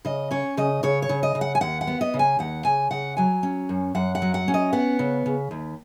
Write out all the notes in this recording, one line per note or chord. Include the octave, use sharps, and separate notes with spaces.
C#3 D#5
C#4 C#5
C#3 D#5
C#3 C#5
C#5
C#3
D#5
C#3
F#5
G#5
D#2 F#5
F#5
B3
D#5
C#3
G#5
D#2 F#5
C#3 G#5
C#3 F#5
F#3 G#5
C#4
F#2
F#2 F#5
F#5
F#3
F#5
C#4
D#5
B3 F#5
C#3
C#3
D#2